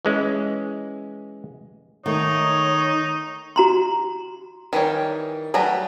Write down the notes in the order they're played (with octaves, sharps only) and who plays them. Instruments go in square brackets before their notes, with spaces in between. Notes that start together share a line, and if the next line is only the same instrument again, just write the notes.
[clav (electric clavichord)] E3 G#3 C#4
[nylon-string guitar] D#3 A3 [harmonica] D#4 [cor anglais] C#5
[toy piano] F#4 A#5 C6
[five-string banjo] D#3 E3 G3 C#5
F#3 G3 A3 B4 A#5